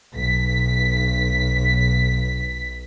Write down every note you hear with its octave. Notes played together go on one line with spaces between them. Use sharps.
B1 B6